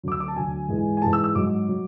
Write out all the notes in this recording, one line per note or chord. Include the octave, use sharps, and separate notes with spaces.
D2 D3 F#3 D6
E6
D6
A5
D2 D3 F#3 G#5
G#2 E3 G#3
G#5
G#2 E3 G#3 A5
E6
E6
G#2 F#3 D6
F#3